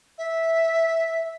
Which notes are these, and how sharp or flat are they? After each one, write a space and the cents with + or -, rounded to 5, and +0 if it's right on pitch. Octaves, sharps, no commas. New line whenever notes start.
E5 -5